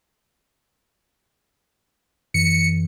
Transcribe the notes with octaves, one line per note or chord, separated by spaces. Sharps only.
F#2 E3 C#7